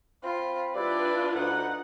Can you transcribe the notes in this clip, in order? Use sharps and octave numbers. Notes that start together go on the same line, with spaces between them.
C4 F4 B5
G3 D4 E4 F4 B4 D5
D2 D#4 F#5